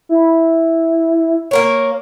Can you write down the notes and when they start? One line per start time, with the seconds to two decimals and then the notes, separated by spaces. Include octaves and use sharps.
0.09 E4
1.51 A#3 A#4 C#5